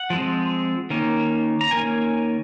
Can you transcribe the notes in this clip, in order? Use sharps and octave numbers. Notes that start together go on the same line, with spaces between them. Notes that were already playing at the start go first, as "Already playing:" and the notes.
Already playing: F#5
F3 G#3 C4
D#3 A#3 C#4
A#5
D#3 A#3 C#4 G#5